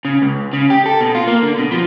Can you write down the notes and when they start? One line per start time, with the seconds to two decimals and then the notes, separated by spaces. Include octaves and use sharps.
0.05 C#3
0.22 C#2
0.53 C#3
0.70 G4
0.86 A4
1.01 B2
1.15 F4
1.27 A#3
1.43 D3
1.58 B2
1.71 F3